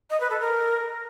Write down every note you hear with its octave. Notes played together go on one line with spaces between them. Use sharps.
D#5
B4
A4
A#4